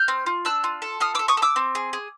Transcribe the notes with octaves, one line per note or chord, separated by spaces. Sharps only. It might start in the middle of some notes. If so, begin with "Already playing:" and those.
Already playing: F6 G6
C4
F4
D4 E6 F#6
F4
A4
F4 D#6 F6
A4 D6 E6
C#6 D#6
A4
D6 E6
C4
G#4
G#4